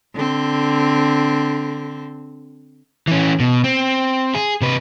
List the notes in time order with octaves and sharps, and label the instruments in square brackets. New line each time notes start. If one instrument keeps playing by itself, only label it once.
[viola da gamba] D3 C4
[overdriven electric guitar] E3 C#4
B2
C4
G#4
C3 B4